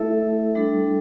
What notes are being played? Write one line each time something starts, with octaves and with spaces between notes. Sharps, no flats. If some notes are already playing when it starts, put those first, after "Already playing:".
Already playing: A3 E4 A4 E5
G3 D4 A4